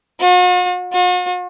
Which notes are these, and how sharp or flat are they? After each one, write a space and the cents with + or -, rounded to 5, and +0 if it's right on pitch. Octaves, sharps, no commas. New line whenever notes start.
F#4 -45
F#4 -45